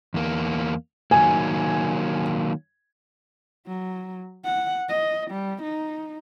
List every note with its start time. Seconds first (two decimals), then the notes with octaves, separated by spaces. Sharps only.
0.14 E2 A#3
1.11 D#3 F#3 A#3 G#5
3.66 F#3
4.44 F#5
4.89 D#5
5.31 G3
5.62 D#4